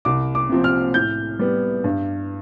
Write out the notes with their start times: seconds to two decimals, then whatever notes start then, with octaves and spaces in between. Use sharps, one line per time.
0.05 C2 D6
0.35 D6
0.49 C3 F3 C4
0.64 F6
0.94 A2 G6
1.39 G3 B3
1.84 G2